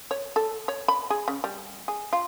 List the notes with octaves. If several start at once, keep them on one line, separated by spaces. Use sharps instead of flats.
C#5
A4
C#5
B5
G#4
C#3
G3
G#4
F4